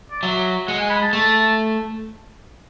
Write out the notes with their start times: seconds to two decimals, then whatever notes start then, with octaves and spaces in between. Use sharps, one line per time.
0.11 D5
0.23 F#3 E5
0.67 G#3 F#5
0.79 G#5
0.90 B5
1.01 A5
1.12 A3 A5